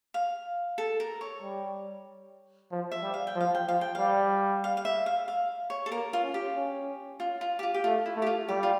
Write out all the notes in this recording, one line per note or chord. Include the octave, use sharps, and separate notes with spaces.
F5
A4
A#4
C#5
G3
F3
E5
G3
F5
G5
F3
F5
G5
F3 F5
G5
G3 F5
F5
F5
E5
F5
F5
C#5
A4
A#3 A#4
F4
C#4
G4
C#4
F4
F4
G4
F4
G4
A3 F4
E4
A3
G4
F4
G3 G4
F4